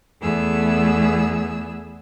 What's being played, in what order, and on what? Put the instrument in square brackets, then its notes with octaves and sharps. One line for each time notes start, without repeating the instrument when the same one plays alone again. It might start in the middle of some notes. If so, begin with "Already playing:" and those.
[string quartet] E2 A3 B3 G#4 E6